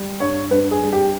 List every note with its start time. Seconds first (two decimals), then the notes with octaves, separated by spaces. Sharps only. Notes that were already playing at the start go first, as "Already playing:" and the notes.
Already playing: G3
0.20 G2 C#5
0.51 G2 B4
0.71 G#4
0.82 G3
0.92 G4